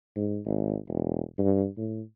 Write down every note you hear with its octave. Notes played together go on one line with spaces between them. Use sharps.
G#2
G#1
E1
G2
A2